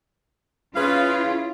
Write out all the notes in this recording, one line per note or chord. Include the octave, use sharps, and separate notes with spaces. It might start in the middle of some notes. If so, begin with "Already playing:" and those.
C#4 E4 F4 G#4 B4 F5